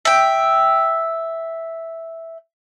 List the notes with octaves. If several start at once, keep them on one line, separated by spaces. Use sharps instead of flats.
E5 G5